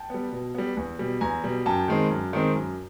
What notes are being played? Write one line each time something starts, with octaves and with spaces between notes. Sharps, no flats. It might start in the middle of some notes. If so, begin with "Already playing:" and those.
Already playing: G5 A5
G3 B3
B2
G3 B3
E2
B2 G3
E2 G#5 A#5
B2 G3
F#2 G5 A5
D#3 G#3 C4
F#2
D#3 G#3 C4
F#2